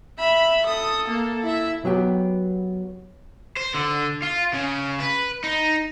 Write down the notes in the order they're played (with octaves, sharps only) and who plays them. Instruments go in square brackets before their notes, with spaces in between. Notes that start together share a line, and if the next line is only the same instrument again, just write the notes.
[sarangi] E5 [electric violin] B5
[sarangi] A4 [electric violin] D#6
[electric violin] A#3
E4 E5
[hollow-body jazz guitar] F#3 B3 G4
[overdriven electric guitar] C5
D3
F4
C#3
B4
D#4